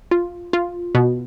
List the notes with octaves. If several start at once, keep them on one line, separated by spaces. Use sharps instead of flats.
F4
F4
B2